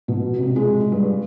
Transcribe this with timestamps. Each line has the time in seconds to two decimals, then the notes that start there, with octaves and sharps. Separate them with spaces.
0.08 B2
0.38 C3
0.56 G#3
0.92 G2